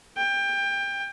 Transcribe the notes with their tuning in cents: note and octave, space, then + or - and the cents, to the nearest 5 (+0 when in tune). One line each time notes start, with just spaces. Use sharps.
G5 +25